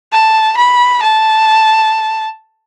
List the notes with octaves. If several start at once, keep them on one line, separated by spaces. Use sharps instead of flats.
A5
B5
A5